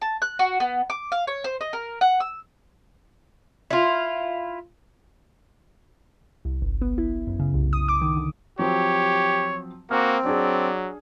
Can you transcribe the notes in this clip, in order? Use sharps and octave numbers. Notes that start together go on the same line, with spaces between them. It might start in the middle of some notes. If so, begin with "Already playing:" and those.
A5
F#6
F#4
B3
D6
F5
C#5
C5
D#5
A#4
F#5
E6
E4 F4
C2
G1
B3
E4
F#2
C#3
C2
D#6
D6
D#3
D3
F3 F#3 C4 G4 C#5
A#3 C4 F#4 A#5 D6 F6
F#3 D4 G#4 D5